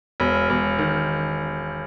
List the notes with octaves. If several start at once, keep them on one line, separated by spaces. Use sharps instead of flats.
E1
E1
D#3